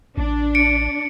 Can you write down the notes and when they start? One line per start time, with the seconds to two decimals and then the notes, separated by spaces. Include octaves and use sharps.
0.17 A1 D4
0.55 C#7 D7